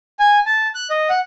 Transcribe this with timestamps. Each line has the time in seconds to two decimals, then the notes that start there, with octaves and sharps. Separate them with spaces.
0.19 G#5
0.46 A5
0.75 F#6
0.90 D#5
1.09 F#5